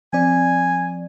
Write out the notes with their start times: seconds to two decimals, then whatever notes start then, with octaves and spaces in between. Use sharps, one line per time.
0.13 F3 C4 D5 G#5